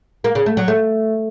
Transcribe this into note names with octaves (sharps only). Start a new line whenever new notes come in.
A#3
C#3
A3
F#3
A3